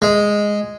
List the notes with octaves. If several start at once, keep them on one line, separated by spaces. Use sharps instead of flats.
G#3